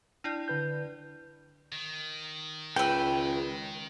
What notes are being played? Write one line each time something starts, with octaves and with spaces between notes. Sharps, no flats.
D4 E4 D5
D3 B4 G6
D#3
C#2 B4 G5 E6